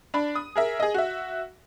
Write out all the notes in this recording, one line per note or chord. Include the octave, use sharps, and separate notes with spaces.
D4 D5 B5
D#6
G#4 A#4 E5
G#4 D#5
F#4 E5